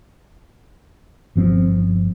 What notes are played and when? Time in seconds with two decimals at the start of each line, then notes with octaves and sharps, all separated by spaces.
1.35 G1 F3 C4